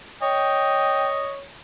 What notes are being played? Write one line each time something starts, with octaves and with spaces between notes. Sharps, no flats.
C#5 D#5 G5